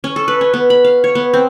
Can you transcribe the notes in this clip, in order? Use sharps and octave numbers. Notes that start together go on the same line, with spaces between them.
C#4
A4
B4
C#4
B3
B5
F5
C#5
B3
C4